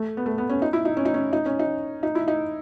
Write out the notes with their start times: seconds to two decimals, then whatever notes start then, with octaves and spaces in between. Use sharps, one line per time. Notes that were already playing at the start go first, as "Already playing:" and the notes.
Already playing: A3
0.17 B3
0.26 A3
0.38 B3
0.49 C#4
0.62 D#4
0.73 E4
0.85 D#4
0.97 C#4
1.05 D#4
1.14 C#4
1.33 D#4
1.46 C#4
1.59 D#4
2.03 D#4
2.15 E4
2.28 D#4